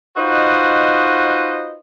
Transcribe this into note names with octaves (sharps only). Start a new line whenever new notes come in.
D#4 F4 F#4 B4 C5 D#5